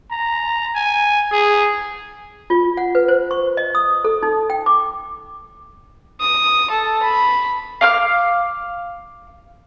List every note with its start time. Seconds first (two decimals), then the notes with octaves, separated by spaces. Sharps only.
0.11 A#5
0.75 G#5
1.32 G#4
2.50 F4
2.77 F#5
2.95 B4
3.08 C5
3.31 C#6
3.57 D#5
3.75 D#6
4.04 A4
4.23 D#4
4.50 G5
4.66 D6
6.20 D#6
6.70 A4
7.03 B5
7.81 F5 D6 F6